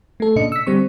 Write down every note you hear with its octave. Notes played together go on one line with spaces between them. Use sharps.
A3 A4
A#2 C#3 D4 D#5 C#7
E6 B6
D3 G3 C4 C#6